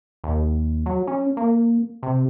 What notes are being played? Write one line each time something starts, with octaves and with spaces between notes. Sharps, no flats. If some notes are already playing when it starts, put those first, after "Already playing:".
D#2
F#3
C#4
A#3
C3